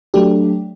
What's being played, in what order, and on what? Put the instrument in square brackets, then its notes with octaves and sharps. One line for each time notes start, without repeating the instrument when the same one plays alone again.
[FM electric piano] F#3 A3 D4 G4